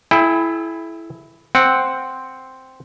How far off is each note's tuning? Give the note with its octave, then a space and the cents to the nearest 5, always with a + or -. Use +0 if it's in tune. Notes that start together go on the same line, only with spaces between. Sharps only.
E4 +5 A4 -45 G5 +40
C4 +0 F#5 +0